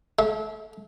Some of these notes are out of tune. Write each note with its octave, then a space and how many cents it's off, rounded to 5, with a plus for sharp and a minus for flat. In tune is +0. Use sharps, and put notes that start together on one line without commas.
A3 -35 E5 -30